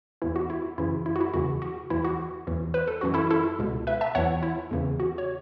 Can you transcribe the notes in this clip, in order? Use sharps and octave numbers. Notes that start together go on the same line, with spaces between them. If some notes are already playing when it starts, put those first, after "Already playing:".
E2 E3 E4
F#4
E4
F#2 C#3 E3 E4
E4
F#4
E4
E2 C#3 E3 F#4
F#4
E2 E3 E4
F#4
E2 E3
B4
A4
F#2 E3 F#4
E4 A4
E4 A4
C#2 B2
B4 E5
E5 A5
E2 E3 C#5 F#5
E4
E2 C#3 E3
F#4
C#5